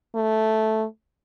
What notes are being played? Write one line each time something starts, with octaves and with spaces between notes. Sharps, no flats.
A3